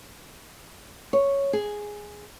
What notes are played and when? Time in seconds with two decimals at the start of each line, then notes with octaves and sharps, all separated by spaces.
1.13 C#5
1.53 G#4